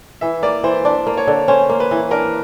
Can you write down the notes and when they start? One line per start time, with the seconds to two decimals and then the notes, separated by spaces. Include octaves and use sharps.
0.21 E3 E5
0.42 A#3 D5
0.64 E3 C5
0.85 D4 D5
1.07 A#3
1.17 C#5
1.27 D3
1.48 C#4 C5
1.69 A#3
1.80 B4
1.91 E3
2.11 D4 A#4